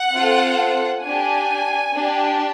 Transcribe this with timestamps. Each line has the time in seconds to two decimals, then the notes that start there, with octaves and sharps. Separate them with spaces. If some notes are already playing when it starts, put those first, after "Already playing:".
Already playing: F#5
0.13 C4 F4 A4
1.04 D4 G4 G#5
1.94 D4 G4